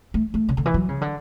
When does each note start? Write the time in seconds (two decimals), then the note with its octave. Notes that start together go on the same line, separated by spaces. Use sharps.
0.14 A3
0.34 A3
0.49 C#3
0.57 D3
0.66 E3
0.74 F#3
0.89 C#3
1.01 D3